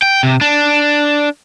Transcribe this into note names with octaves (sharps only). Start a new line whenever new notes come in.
G5
C3
D4